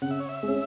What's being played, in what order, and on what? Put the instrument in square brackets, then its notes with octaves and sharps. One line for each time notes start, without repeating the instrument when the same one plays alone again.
[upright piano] C#3 [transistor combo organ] F#5
[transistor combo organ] E5
C#5
E5
[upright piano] G#3
C#4